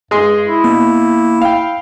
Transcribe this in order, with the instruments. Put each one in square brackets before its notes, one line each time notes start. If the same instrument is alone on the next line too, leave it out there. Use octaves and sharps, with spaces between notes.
[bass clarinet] G2 [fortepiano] G#3 G#4 C6
[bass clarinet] E4
[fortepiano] B2 [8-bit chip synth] A#3
[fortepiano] F5 G5